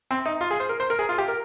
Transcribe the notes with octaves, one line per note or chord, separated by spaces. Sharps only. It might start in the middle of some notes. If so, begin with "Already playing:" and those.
C4
D#4
F4
G#4
C5
A#4
C5
A#4
G#4
F4
G4
A#4